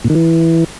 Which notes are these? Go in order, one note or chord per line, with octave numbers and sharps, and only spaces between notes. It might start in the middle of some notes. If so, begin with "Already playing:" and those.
A#2
D#3
E3